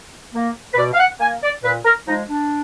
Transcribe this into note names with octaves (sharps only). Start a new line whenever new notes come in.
A#3
B4
B2 D5
F5
F#5
A#3 G#5
D5
A#2 B4
A#4
F3 G#3 D#4
D4